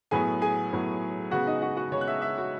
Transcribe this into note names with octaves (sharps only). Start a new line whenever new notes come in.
A2 F#3 B3 G#4 G#5
G#4 G#5
A2 F#3 B3
C#3 G#3 B3 F#4 F#5
D#4 D#5
F#4 F#5
F#4 F#5
C#3 G#3 B3 C#5 C#6
F#6
E5 E6
E5 E6
F#4 F#5